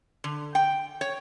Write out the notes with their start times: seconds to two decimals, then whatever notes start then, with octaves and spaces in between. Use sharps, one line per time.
0.24 D3
0.55 G5
1.01 C#5